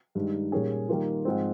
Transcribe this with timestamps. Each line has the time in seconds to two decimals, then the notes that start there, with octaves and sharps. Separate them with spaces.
0.15 G2 D#3 G#3 D#4
0.52 A#2 G3 A#3 C#4 G#4
0.89 D#3 G3 A#3 F4
1.25 G#2 F3 C4